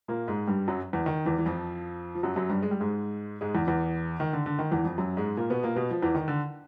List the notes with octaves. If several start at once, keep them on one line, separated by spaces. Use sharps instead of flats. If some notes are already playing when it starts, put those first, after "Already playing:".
A#2 A#3
G#2 G#3
G2 G3
F#2 F#3
E2 E3
D#3
E2 E3
E3
F2 F3
F3
F#2 F#3
F#2 F#3
G2 G3
G#3
G3
G#2 G#3
G#2 G#3
E2 E3
E2 E3
D#3
D3
D3
D#3
E2 E3
F2 F3
F#2 F#3
G#2 G#3
A#2 A#3
B2 B3
A#2 A#3
B2 B3
F3
E2 E3
D#3
D3